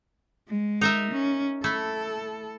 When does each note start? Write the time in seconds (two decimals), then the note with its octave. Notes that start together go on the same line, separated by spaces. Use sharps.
0.48 G#3
0.81 D#4 A#4 E5
1.12 C#4
1.64 A3 E4 A4